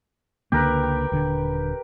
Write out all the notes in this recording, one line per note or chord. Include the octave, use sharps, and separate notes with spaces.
C#2 D3 A#3 G4 A#4 B4
G5
D#1 D3